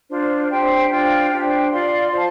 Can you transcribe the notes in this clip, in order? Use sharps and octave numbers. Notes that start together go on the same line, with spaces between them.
D4 F4 C5
D4 G4 C5 G5
D4 F4 C5 G5
D4 G4 C5 G5
F4 D5 F5 C6
F4 C5 F5 A5